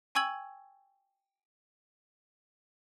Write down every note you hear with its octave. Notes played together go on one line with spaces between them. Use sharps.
G5 G#5 C#6 E6 G#6 F#7